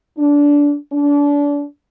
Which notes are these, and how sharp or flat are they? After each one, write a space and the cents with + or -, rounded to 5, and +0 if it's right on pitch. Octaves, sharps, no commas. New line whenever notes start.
D4 -20
D4 -30